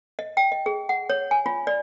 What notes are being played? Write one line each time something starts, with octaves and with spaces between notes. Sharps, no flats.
D#5
G5
D#5
G#4
F#5
C#5
G#5
F4
D5